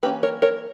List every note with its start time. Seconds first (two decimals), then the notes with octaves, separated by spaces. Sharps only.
0.03 E3 A#3 C#4 G4 B4
0.23 A#4 C#5
0.42 A#4 C#5